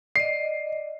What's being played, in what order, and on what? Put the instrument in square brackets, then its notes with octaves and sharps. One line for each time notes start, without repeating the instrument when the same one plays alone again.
[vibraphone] D5 D#5 [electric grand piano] C7